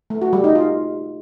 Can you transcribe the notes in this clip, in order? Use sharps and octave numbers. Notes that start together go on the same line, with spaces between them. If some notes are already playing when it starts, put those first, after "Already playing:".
A3
F#4
G3
D#4
F4